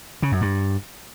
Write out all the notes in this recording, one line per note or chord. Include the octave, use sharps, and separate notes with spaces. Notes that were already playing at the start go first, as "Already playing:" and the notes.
C#3
F#2
G2